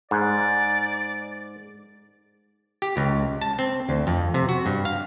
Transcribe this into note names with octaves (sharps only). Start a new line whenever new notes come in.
G#2 D5
G4
C#2
A5
C4
D2
F2
C3
F#4
G2
F5